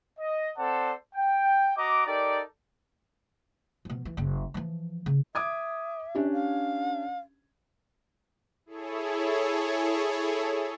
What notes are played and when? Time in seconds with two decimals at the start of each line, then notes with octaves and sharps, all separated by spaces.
0.19 D#5
0.58 C4 A4 C5 D5 F#5 A5
1.15 G5
1.77 F#4 D#5 A#5 D6
2.06 D#4 G4 A4 A#4 D5
3.85 B2 F3
4.05 E3
4.17 F#1 C#3
4.54 E3 F3
5.06 C#3
5.35 E5 D6 D#6 G#6
6.15 C#4 D4 G4
6.32 F5
8.66 E4 G#4 A4 C#5